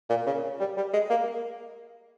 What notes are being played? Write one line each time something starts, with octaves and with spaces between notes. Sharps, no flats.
A#2
C#3
G3
G3
G#3
A#3